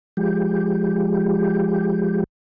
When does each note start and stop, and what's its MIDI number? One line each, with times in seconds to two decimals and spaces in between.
0.17 2.24 53
0.17 2.24 56
0.17 2.24 67